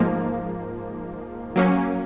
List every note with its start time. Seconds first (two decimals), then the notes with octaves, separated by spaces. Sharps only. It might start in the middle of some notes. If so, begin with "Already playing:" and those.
Already playing: G#2 F3 A#3
1.56 F#3 A#3 C#4